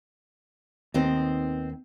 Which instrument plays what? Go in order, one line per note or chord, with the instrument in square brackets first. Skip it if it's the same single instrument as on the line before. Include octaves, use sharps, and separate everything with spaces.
[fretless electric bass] D#2 D#3 [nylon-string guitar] B3 C4 D#4